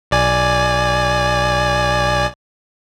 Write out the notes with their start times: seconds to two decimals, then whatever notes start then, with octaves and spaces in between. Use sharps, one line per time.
0.11 B1 D5 G#5